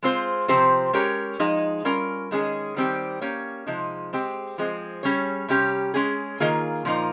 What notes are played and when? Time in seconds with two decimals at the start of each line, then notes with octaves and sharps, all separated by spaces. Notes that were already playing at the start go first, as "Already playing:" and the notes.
0.03 G#3 C4 F4 C5
0.48 C3 F3 C4 G4 C5
0.93 G#3 C#4 G4 A#4 C#5
1.39 F3 G#3 D#4
1.85 G3 C#4 F4 A#4
2.31 D#3 G#3 C#4 G#4
2.76 D#3 G3 C4 G4
3.21 A#3 C#4 G4 C#5
3.66 C3 F3 G#3 D#4
4.13 G#3 C4 G4
4.58 F3 G#3 C4
5.03 G3 C#4 G#4 C#5
5.48 C3 G3 C#4 G4
5.94 G#3 C#4 G#4
6.40 D#3 A#3 F4 G#4
6.85 A#2 F3 A#3 D#4